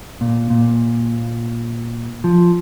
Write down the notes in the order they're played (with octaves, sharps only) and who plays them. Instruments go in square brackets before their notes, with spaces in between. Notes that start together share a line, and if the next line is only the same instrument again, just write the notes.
[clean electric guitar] A#2
A#2
F3